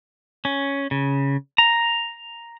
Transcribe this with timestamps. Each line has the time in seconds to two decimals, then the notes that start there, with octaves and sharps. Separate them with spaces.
0.45 C#4
0.91 C#3
1.58 A#5